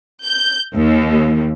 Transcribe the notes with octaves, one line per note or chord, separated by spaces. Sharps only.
G6
D#2